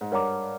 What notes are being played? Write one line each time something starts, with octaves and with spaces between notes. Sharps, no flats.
G#2
G2 A#4 C#5 F#5 A#5 D6